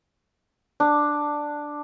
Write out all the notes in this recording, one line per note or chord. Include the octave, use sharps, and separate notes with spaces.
D4